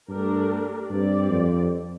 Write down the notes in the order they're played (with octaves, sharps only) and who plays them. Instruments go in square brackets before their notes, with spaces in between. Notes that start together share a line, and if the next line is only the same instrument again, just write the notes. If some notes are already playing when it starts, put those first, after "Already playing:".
[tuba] G2 [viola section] A3 D4 G4 A#4
[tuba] G2 [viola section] C4 G4 D5
[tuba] F2